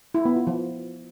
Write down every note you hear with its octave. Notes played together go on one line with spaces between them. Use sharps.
E4
B3
F4
F3